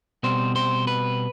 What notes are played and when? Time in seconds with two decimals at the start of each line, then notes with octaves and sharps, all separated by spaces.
0.23 B2 G3 C4 C5
0.56 C5
0.87 B4